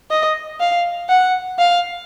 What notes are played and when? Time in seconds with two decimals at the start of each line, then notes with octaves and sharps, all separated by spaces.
0.11 D#5
0.60 F5
1.09 F#5
1.59 F5